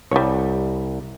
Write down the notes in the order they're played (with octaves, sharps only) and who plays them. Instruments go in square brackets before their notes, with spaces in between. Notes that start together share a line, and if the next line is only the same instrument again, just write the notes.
[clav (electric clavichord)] C2 [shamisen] G3 C#5